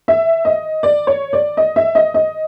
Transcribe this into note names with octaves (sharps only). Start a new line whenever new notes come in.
E5
D#5
D5
C#5
D5
D#5
E5
D#5
D#5